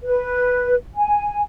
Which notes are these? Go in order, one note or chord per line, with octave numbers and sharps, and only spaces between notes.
B4
G#5